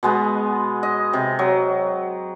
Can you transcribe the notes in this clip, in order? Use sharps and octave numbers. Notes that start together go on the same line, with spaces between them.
B2 G#3 B3
D#5
C3
F#3